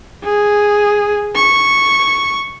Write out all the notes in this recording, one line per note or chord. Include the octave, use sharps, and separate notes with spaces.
G#4
C#6